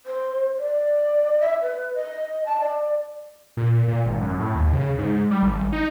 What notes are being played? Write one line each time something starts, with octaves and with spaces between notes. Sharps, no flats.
C5
D5
E5
B4
D#5
A5
D5
A#2
A#2
G#1
F#2
A2
D#2
C#3
G#2
G3
G#1
D#4